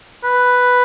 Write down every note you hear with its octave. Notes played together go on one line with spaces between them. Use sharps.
B4